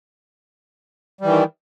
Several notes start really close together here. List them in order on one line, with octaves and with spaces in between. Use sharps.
G3 E3 D#3